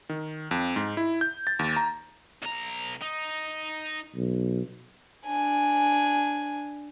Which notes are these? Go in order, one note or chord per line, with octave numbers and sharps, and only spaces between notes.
D#3
F2
G#2
E4
G6
A6
D#2
A#5
B1 A#5
D#4
B1
D4 G#5